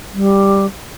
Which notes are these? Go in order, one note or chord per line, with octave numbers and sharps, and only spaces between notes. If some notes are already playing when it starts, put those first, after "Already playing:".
G3